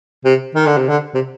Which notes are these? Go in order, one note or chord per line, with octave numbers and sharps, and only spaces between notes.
C3
D#3
D3
C3
D3
C3